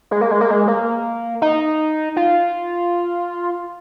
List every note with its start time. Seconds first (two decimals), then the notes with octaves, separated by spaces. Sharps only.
0.11 G#3
0.21 A#3
0.31 G#3
0.41 A#3
0.50 G#3
0.67 A#3
1.42 D#4
2.16 F4